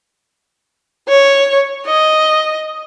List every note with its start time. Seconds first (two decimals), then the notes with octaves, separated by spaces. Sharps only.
1.08 C#5
1.86 D#5